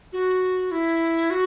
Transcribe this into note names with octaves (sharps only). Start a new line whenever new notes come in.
F#4
E4
F#4